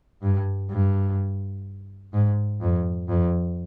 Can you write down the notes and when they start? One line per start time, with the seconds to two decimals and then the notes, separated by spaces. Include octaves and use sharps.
0.22 G2
0.70 G2
2.13 G#2
2.61 F2
3.08 F2